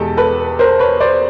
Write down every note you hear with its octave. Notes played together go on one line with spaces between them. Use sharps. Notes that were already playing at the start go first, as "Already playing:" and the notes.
Already playing: E2 B2 G#3 G4 A4
A4 B4
A#4 C5
B4 C#5
C5 D5